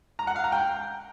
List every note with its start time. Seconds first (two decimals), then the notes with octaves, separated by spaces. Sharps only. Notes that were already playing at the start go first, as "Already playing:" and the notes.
0.19 A#5
0.27 F#5
0.36 F5
0.44 A#5
0.52 G5